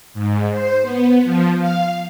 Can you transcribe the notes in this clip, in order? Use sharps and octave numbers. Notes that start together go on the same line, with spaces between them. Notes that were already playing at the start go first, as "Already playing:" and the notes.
G#2
C5
B3
F3
F5